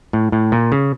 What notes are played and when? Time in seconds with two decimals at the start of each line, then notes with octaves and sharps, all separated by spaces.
0.13 A2
0.32 A2
0.52 A#2
0.72 C#3